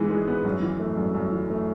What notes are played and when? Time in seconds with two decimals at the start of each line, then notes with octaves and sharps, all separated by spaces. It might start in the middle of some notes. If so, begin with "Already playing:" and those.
Already playing: G#2 E3 G#3 B3
0.10 G#3
0.28 B3
0.45 F#2
0.62 E3
0.80 A3
0.97 F#2
1.15 F#2
1.32 E3
1.50 A3